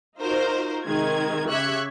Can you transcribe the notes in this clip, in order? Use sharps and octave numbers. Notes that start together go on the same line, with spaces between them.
D#4 F4 F#4 A#4 C5
C3 D#3 G#3 G#6
C#3 G4 E5 C#6 F#6 G#6